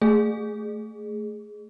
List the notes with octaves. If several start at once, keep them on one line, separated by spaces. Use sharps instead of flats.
A3 G#4